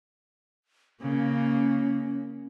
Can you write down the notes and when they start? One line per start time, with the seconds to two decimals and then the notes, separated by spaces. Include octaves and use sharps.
1.02 C#3 A#3 C#4